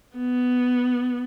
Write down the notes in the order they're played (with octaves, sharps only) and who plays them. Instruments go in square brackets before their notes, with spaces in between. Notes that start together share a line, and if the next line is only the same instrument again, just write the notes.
[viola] B3